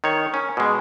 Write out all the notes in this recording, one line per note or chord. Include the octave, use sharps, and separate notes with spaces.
D#3 C#5
C#4
B2 G#3